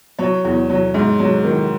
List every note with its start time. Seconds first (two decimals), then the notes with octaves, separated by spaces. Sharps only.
0.19 F#3 C#5
0.45 E2
0.70 F#3
0.94 G#2
1.20 F#3
1.44 D#3